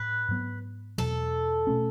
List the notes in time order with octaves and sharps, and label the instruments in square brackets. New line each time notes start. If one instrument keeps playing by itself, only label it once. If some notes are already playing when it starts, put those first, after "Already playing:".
Already playing: [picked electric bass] A2 [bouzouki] B4
[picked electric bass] G#2 F#3 B3
[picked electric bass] E2 B2 F#3 [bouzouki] A4
[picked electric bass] B2 A3 C#4